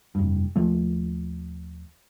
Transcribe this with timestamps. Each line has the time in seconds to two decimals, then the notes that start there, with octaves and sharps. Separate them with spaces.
0.15 F1 G2
0.56 D#1 F3 A3